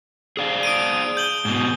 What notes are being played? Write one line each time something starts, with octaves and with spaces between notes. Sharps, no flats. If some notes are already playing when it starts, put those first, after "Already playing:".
G#4 D5 F5
D#6 D7 D#7
G6 F#7 G7
G#2 B2